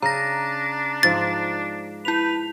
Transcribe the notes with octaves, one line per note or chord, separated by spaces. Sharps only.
C#3 D4 A#5 A#6
G#2 F3 D5 A6
E4 B4 F7